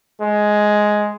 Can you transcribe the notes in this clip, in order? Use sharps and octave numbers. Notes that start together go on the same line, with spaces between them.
G#3